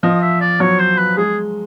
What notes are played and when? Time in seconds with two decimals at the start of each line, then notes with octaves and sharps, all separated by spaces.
0.03 F3 D#5
0.22 E5
0.41 D5
0.60 F#3 C#5
0.79 C5
0.98 B4
1.17 G#3 G#4